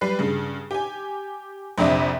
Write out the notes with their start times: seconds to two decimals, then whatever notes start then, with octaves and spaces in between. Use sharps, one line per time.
0.01 G3 B4 C7
0.19 G2 C#3
0.71 G4 G#5
1.78 A#1 F2 C3 D4 D5 E5